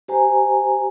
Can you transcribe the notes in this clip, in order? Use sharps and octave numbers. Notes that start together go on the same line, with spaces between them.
G4 C5 G#5 A#5